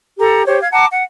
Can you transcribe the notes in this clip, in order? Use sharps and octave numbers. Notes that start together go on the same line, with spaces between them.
G4 A4 A#5
G4 C5 C#5
F5 G#6
F#5 A5 A#5 D6
F#5